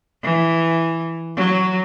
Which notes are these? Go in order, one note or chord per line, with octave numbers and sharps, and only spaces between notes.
E3
F#3